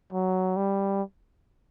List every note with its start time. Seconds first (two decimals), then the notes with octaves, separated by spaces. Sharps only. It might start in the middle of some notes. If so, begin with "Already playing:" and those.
0.12 F#3
0.57 G3